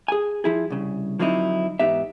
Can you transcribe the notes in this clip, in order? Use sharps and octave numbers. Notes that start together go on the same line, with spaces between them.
G#4 G#5
F3 E4 G#4
C2 C#3
D3 F3 F#3 C4 D#4 E4
E2 G#2 B3 D#4 G4 E5